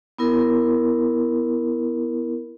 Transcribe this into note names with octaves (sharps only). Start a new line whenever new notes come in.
B3 E4 A#4